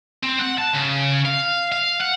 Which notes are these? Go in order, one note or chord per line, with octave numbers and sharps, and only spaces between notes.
C4
F#5
A5
C#3
F5
F5
F#5